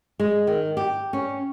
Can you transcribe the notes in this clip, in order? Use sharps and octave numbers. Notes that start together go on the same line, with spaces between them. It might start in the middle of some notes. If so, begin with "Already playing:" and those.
G#3
D#3
G4
C#4